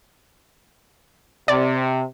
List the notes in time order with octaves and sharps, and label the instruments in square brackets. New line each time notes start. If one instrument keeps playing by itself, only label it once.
[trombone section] C3 [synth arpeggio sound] D5